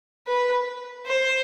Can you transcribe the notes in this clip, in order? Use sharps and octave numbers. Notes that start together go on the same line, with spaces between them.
B4
C5